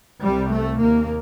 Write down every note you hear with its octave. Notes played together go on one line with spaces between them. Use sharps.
C2 C3 G3
A3
D#2 A#3